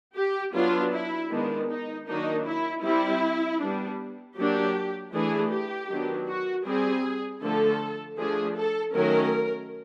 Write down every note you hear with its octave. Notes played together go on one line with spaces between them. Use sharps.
G4
F#3 B3 D4 F4
E4
D#3 G#3 B3 D4
D#4
D#3 F#3 A#3 D4 D#4
E4
G3 C4 E4
G3 B3 D4
F#3 A#3 D4 G4
E3 A3 D4 G#4
G4
D#3 F#3 B3 D4
F#4
G3 C4 G#4
D3 F3 A3 A4
F3 A3 D4 G#4
A4
D#3 F#3 A3 C#4 A#4